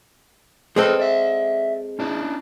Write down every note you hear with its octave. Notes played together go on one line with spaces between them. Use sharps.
G#3 C4 G#4 A4 B4
D5 E5
C#4 D4 E4